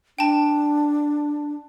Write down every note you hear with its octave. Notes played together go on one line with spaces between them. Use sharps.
D4 G5 A5